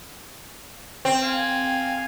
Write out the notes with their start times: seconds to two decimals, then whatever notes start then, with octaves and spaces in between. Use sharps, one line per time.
1.05 C4
1.23 F5 G#5